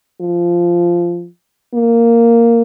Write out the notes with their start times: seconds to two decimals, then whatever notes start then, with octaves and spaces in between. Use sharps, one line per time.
0.21 F3
1.74 A#3